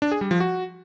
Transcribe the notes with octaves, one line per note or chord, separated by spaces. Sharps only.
D4
G#4
G3
F3
F#4